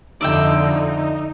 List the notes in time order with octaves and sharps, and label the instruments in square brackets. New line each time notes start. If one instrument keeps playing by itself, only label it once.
[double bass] F2 D3 [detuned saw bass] D#4 [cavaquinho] D5 E5 G5